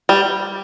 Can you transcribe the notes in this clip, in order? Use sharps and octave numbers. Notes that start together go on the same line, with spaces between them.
G3